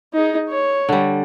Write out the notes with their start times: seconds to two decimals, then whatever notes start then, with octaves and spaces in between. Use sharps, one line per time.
0.14 D#4 G#4
0.49 C#5
0.89 D3 G3